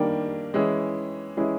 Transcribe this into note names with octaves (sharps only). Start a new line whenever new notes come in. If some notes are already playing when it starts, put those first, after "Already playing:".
Already playing: D#3 G3 A#3 D4
E3 G#3 C#4 E4 G#4
E3 G#3 C#4 E4 G#4